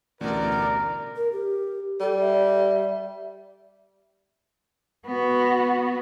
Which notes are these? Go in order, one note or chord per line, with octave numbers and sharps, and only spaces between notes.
A1 D2 B2 A#4 D5
A#4
G4
G3 A4
E5
B3 F#4